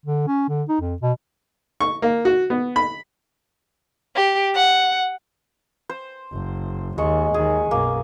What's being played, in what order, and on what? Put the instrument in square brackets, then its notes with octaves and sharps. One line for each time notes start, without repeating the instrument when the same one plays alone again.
[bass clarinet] D3
C#4
D3
D#4
F2
B2
[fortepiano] C#6
A#3
F#4
B3
B5
[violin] G4
F#5
[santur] C5
[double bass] F#1
[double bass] D#2 [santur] G#3 C#6
[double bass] D#2 D#3 [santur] G#4
[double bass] B1 F#2 [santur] A#3